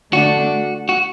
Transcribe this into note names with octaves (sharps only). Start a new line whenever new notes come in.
D3 A3 D4 F#4
F#4